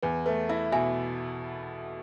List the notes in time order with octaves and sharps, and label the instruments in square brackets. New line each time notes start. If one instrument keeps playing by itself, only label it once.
[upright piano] E2 [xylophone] B4
[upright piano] A3 [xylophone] B4
[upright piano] E4 [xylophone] E5
[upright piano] B2 [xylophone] E5 G#5